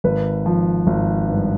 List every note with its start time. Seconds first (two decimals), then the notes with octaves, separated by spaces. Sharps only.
0.04 G#1 B4
0.46 F3
0.87 G#1
1.28 G2